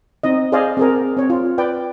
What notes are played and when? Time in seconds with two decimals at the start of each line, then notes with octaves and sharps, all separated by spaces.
0.23 C4 D#4 D#5
0.52 G#4 C5 D5 D#5 F5
0.77 C4 G#4 A#4
1.17 C4 C#5
1.30 F4
1.58 B4 D5 G5